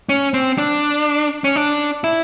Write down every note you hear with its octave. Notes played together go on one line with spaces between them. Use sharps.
C#4
C4
D4
C#4
D4
E4